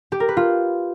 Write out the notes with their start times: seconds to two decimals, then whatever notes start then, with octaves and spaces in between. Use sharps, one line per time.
0.12 G4
0.20 A#4
0.28 B4
0.37 F4